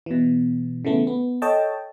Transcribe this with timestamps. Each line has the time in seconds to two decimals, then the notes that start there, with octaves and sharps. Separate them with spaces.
0.06 B2 E3
0.85 C#3 E3 A3 B3
1.07 B3
1.42 A4 C#5 D#5 G5 A5